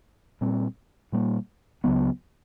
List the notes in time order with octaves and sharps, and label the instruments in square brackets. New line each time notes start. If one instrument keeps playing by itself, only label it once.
[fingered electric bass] A#2 G3 C4
A#2 G3 A#3
C#2 C#3 F#3 B3